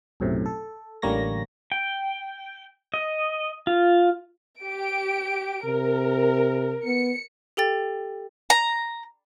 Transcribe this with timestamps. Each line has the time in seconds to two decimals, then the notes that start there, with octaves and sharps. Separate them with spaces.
0.20 B1 F#2 A2 C3
0.46 A4
1.02 A1 D3 G3 A#3 C#5 A#6
1.72 G5
2.94 D#5
3.67 F4
4.61 G4 D7
5.65 C3 A#4
6.85 B3 C#7
7.57 G4 A4 G5 A6
8.50 A#5